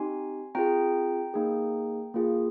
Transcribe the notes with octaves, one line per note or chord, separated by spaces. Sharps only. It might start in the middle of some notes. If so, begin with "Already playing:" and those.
Already playing: C4 D#4 G4 G#5 C6
C4 F4 G#4 G5 A#5
A#3 D#4 G#4
A#3 F4 G#4